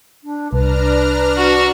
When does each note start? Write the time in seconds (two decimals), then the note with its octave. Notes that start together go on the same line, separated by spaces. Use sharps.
0.24 D4
0.53 C2 D4 B4 A#5 F6
1.37 F#4